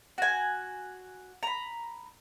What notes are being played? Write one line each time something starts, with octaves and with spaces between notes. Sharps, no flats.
F#4 G#5
A#5 B5